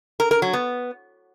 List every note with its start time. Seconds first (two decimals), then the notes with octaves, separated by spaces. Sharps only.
0.20 A#4
0.31 A#4
0.42 F#3
0.53 B3